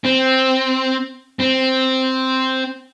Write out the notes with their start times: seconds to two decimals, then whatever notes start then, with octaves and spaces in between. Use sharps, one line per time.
0.05 C4
1.40 C4